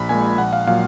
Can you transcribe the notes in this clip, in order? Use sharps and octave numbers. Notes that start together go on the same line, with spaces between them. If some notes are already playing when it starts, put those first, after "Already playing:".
Already playing: A#1 B5
A#2 G#3 G#5
A#1 F#5
F5
A#2 F#3 F5